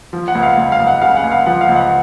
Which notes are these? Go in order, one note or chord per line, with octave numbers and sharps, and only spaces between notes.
F3
F#5
C#2
F5
C#2
F5
C#2
F#5
C#3 F5
F#5
C#2
F5
F3 F#5
F5
C#2
F#5